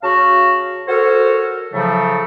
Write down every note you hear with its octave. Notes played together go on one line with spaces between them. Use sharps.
C#3 F#4 F5 A5 A#5
F#4 A4 A#4 C5 C#5
A2 C#3 F3 F#3 A3